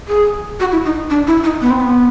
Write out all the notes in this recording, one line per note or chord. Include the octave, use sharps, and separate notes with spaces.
G#4
F#4
E4
D#4
D4
E4
D#4
B3
C4
B3